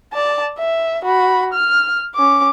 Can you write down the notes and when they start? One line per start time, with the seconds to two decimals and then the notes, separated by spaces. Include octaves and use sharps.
0.14 D5 A5
0.59 E5
1.05 F#4 B5
1.53 F6
2.15 C#4 D6